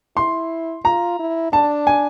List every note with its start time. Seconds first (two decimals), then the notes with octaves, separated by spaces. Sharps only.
0.16 E4 C6
0.84 F4 A#5
1.19 E4
1.52 D4 A5
1.87 G#5